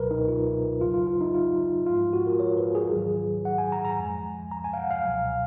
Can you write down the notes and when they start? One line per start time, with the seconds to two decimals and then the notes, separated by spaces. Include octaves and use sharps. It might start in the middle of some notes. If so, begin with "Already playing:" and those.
Already playing: C#2 B2 F#3 A#4 B4
0.11 D#4
0.28 F4
0.81 F2 C#3 F#3 F4
0.94 F4
1.07 F4
1.21 D#4
1.34 F4
1.87 G#2 F3 G#3 F4
2.13 F#4
2.27 A#4
2.40 C#5
2.57 B4
2.75 G#4
2.93 G#2 D#3 F#3
3.45 F#5
3.58 G#5
3.72 A#5
3.85 A#5
3.98 F2 F3 G#3 G#5
4.51 A#5
4.64 G#5
4.73 F5
4.77 F#5
4.91 F5
5.04 C#2 B2 F#3